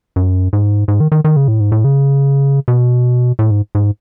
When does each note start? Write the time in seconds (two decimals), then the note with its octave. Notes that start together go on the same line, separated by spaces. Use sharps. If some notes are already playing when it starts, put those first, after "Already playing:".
0.16 F#2
0.53 G#2
0.88 G#2
1.00 D#3
1.12 D#3
1.25 D#3
1.36 C#3
1.48 A2
1.60 G#2
1.72 A2
1.84 C#3
2.68 B2
3.39 A2
3.51 G#2
3.75 G#2